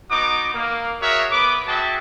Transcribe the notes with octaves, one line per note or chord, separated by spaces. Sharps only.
B3 D#4 F#4 D6
A#3
F#4 G#4 A#4 C#5 E5
B3 B4 D6
F#4 G#4 E5 G5 A5